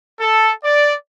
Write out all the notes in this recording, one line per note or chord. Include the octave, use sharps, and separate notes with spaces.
A4
D5